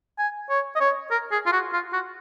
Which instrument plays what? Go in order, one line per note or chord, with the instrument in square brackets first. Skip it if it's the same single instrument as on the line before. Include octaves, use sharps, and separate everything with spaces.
[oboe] G#5
C#5
D#5
C#5
A#4
G#4
F4
F#4
F4
F#4